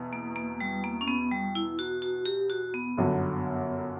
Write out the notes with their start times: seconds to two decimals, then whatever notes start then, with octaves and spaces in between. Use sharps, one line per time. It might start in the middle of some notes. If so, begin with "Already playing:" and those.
Already playing: E2 B2
0.13 A#3
0.36 A#3
0.60 G3
0.84 A#3
1.01 C#4
1.08 B3
1.31 G3
1.55 E4
1.79 F#4
2.02 F#4
2.26 G4
2.50 F#4
2.74 B3
2.97 G1 F#2 D3 F#3